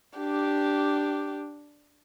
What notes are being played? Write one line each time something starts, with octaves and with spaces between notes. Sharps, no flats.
D4 G4